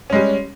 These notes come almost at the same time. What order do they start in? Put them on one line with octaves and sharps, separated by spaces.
C#4 G#3 G3